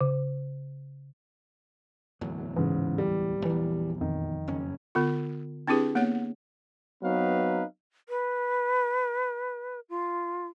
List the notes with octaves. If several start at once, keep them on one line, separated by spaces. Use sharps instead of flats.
C#3
D1 E2 F#3
G#2 C#3 E3
G3
A#1 E2 E3
F2 D#3
F#1 C#4
D3 B3 F4
C4 D4 E4 G4 G#4 B4
A#3 B3 C#5 F#5
F#3 B3 C4 D#4 B4 F5
B4
F4